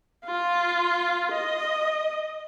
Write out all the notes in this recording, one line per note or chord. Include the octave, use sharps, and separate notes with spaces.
F4
D#5